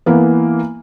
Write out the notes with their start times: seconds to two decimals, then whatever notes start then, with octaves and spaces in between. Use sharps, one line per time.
0.06 E3 A#3 B3